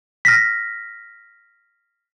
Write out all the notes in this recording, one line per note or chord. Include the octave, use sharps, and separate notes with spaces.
F6 A#6 B6